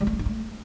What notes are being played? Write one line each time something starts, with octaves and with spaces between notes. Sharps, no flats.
G3
A3
C#4
D4
A3